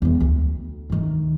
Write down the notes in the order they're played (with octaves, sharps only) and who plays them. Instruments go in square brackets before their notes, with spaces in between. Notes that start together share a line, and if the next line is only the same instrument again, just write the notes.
[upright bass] E2 G#3
D2
D2 D#3